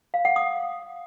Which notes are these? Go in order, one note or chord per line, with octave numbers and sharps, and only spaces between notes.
F5
F#5
D#6